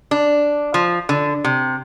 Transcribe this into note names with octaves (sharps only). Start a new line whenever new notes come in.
D4
F3
D3
C3